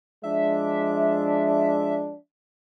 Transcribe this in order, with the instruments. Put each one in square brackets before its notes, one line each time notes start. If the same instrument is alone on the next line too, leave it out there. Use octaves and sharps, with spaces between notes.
[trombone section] F3 G#3 D4 [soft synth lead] E5